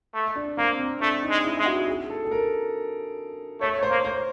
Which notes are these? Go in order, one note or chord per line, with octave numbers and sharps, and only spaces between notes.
A3
D4
A#3 C4
C4
A3 D4
D#4
G#3
E4
G#3
F#4
G#4
A4
A4
A#4
A3 C#5
C#5
C5
A#3
C5